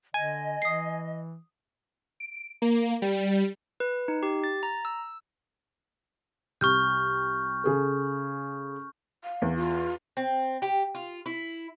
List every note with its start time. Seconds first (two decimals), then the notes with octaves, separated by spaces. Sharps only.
0.14 D3 D#5 G#5
0.62 E3 D#6 C7
2.20 D7
2.62 A#3
3.02 G3
3.80 B4
4.08 D#4
4.23 G4
4.44 A6
4.63 A#5
4.85 E6
6.61 C2 C#6 F6 G6
7.64 C#3 G#4 A4
9.24 F5
9.42 E2
9.56 F4
10.17 C4
10.62 G4
10.95 F4
11.26 E4